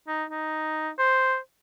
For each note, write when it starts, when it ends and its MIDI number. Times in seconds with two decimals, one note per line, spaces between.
0.08 0.25 63
0.30 0.91 63
0.98 1.37 72